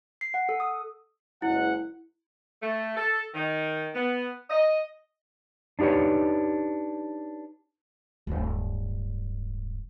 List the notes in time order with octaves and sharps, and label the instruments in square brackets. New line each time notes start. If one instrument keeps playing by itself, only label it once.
[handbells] C7
F#5
A4
D#6
[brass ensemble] F#1 G#3 F#5 [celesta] E4
[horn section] A3
A4
D#3
B3
D#5
[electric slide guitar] D4 D#4 G4 B4 C#5
[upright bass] D1 G2